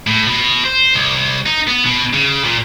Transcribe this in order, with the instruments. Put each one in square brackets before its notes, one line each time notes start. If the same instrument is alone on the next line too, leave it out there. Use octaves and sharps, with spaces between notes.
[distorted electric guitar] A2
B2
C5
C2
D#4
B3
B2
C#3
A#2